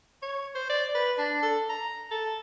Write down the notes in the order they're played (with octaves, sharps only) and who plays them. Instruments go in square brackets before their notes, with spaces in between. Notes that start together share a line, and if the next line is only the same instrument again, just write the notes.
[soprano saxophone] C#5
C5
D5
B4
D4
A4
A#5
A4